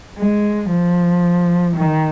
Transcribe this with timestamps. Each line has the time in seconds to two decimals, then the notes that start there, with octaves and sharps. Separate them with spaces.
0.18 G#3
0.71 F3
1.77 D#3